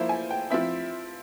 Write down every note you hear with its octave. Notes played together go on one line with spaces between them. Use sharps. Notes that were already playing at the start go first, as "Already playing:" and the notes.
Already playing: F3 A#3 E4 C5
G#5
G5
F3 C4 E4 E5